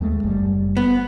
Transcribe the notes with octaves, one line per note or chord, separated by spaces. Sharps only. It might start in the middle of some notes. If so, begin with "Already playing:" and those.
D#2 G#3 A3
F#1 G3
B3